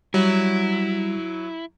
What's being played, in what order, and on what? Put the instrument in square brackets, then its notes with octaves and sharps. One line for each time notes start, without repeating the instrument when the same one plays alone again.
[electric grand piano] F#3 [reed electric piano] G3 [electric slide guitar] E4